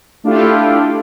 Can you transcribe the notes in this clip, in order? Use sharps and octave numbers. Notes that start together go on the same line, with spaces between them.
A3 D4 E4 F4 G4 A4